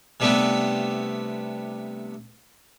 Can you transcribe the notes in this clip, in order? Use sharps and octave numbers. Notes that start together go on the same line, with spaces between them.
C3 G3 A3 B3 C4 D4